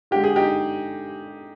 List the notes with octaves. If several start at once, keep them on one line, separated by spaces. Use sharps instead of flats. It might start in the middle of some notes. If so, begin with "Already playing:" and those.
D3 G#3 G4
G#4
D#4 G4